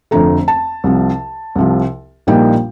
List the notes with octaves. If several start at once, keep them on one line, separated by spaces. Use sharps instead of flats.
F1 F2 D3 A3 A#5
A5
C2 C3 F3
C2 C3 F3
A#1 A#2 G3 A#3 D#4 G5